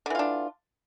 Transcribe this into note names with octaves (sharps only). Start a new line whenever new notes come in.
D3 E3 D4 F4